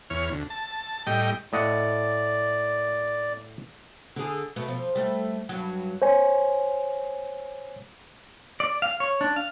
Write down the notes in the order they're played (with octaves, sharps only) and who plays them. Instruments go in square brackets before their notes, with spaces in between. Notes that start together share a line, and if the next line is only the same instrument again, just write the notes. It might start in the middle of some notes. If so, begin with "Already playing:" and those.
[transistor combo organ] E2 C#5 F6
D2
A5
A2 G3 D#5 G5
[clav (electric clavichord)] A2 D#5 F#5 [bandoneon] D5
[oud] D3 G#4
B2 A3
F3
G3 A3
G2 F#3
[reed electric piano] C5 C#5 G#5
[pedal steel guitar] D5
F5
C#5
D4
F5